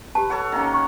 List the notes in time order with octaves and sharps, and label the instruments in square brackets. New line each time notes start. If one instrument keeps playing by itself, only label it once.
[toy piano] G4 A5 [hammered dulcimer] B4
[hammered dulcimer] A4 C#5 F#5
D#3 A#3 C#4
[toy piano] C5 C#6